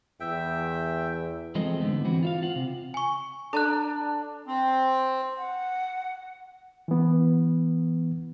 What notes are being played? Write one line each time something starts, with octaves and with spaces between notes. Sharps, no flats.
E2 E5 G5
E2 F3 G#3 C4 A4 D#5
G#2 D3 A3 B3
E3 C4 F#4
F4 E5 F5
F4 C5 F#5
C3
G#5 C#6
D4 A4 A#5 F#6
C4
F#5
E3 B3